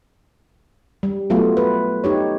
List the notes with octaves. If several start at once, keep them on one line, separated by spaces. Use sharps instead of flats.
G3
F#3 A3 B3 F4
B4
D#4 G4 C#5